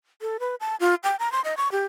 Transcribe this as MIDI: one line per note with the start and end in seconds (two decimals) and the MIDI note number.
0.22 0.37 69
0.40 0.55 71
0.60 0.76 81
0.80 0.95 65
1.04 1.16 79
1.19 1.32 82
1.32 1.41 84
1.44 1.55 75
1.57 1.71 85
1.72 1.85 67